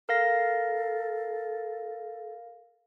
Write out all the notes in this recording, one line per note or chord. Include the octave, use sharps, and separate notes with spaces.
A4 A#4 F5 A#6